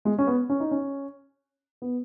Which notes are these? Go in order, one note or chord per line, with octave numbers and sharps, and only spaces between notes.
G#3
C#4
B3
C#4
D#4
C#4
B3